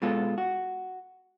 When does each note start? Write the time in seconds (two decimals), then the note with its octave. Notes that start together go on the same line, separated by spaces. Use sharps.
0.02 B2 G#3 F4 A4
0.38 F#4